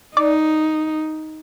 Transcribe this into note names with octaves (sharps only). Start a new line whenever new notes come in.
D#4 D5